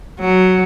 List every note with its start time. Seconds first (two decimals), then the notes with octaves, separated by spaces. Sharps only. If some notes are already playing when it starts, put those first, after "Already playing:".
0.20 F#3